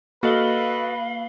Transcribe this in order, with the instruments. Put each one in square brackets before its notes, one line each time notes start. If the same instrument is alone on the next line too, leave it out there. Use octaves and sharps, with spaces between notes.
[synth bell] A#3 F#7 G7 [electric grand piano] F#4 A4 D#5 [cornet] B4 [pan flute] F5